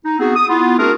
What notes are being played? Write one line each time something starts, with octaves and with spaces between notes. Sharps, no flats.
D#4
B3 C4 D#4 F#4 G#4
D#6
B3 E4 F4
A3 C4 D4 F#4 G#4 A#4